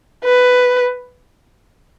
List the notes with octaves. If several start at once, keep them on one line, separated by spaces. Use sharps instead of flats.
B4